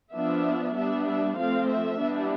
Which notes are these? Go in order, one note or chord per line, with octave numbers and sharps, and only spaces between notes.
F3 B3 D4 E5
G3 B3 D4 E5
E5
F3 A3 C4 F5
E5
E3 G3 B3 D4